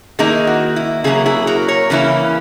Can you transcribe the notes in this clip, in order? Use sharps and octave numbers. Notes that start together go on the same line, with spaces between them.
D#3 A#3 D#4 E4 G#4
F#4
E4
C#3 F#3 A#3 E4 G#4
E4 G#4
F#4 A#4
A#4 C#5
C#3 E3 A#3 C#4 E4